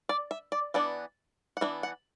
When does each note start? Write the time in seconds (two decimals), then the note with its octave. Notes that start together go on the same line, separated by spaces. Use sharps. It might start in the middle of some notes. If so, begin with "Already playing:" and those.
0.09 D5
0.31 E5
0.52 D5
0.74 E3 B3 D4 D5
1.57 F#5
1.61 E3 B3 D4 E5
1.83 F#5